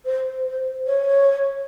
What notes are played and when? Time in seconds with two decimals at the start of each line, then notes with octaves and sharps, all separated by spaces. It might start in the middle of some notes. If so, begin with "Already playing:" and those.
0.05 C5
0.46 C5
0.86 C#5